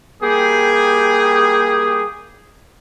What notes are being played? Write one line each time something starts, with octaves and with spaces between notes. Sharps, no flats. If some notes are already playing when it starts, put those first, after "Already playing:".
G3 A#3 G4 G#4